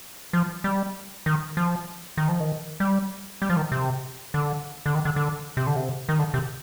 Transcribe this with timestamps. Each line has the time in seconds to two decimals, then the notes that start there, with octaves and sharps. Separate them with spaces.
0.33 F3
0.64 G3
1.26 D#3
1.57 F3
2.17 D#3
2.29 F3
2.40 D#3
2.80 G3
3.42 G3
3.50 F3
3.57 D#3
3.72 C3
4.34 D3
4.86 D3
4.95 D#3
5.05 D3
5.16 D3
5.57 C3
5.67 D3
5.76 C3
6.09 D#3
6.19 D3
6.34 C3